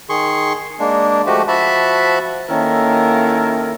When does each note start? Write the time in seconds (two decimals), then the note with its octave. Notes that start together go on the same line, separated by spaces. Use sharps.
0.09 D#3 G#4 C6 C#6
0.80 G#3 A#3 D4
1.26 F3 G#3 A3 F#4 G4
1.48 F3 F#4 E5 A5 B5
2.49 D#3 A#3 C#4 E4 A4 A#4